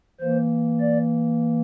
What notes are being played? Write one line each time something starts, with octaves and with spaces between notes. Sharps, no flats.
E3 A#3 C5
D5